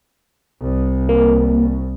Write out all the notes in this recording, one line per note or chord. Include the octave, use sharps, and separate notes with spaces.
C2
A#3